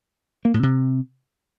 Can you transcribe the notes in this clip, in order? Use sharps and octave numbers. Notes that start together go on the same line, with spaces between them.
A#3
A2
C3